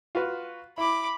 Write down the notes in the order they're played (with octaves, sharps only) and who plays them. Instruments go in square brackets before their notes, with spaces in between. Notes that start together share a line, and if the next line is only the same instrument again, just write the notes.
[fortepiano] F4 F#4 B4
[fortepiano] E4 [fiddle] B5 D6